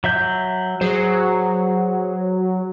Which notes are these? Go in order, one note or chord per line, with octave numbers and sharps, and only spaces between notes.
F#3 E5 G6
F#3 G#4 C5